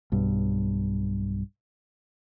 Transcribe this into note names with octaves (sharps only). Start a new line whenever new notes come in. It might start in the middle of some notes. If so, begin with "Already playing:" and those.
B1 G2